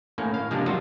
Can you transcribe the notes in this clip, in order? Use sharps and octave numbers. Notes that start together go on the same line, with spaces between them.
A2 A#3 C#4
F5
C3 F3 G3 G#3 A#3 D4
F#3 G3 F4 F#4